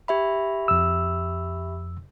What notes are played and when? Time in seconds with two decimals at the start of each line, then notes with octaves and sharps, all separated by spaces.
0.08 G4 E5 B5
0.68 F2 E6